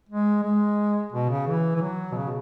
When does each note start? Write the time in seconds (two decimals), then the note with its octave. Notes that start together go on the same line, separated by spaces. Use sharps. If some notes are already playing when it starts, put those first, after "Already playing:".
0.09 G#3
0.43 G#3
1.12 B2
1.29 C#3
1.47 E3
1.75 E3
1.81 F#3
2.12 B2
2.15 C#3
2.26 B2